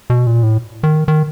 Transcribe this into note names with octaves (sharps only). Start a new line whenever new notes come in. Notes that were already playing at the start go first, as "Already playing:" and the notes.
B2
A#2
A2
D#3
D#3